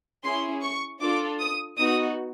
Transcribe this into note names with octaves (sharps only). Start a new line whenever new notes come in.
C#4 E4 G#4 C6
C#6
D4 F4 A4 D6
D#6
B3 D#4 F#4 D#6